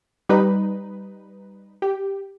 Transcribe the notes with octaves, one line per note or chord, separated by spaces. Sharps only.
G3 D#4 B4
G4